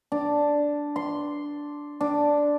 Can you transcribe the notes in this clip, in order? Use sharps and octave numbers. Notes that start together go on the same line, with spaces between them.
D4
C6
D4